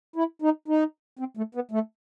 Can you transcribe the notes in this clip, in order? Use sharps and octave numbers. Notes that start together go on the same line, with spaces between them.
E4
D#4
D#4
C4
A3
B3
A3